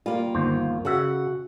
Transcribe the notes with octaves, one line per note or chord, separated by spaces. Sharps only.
G3 A#3 F4
G1 D#2 C5
C#3 F#4 E5 F#5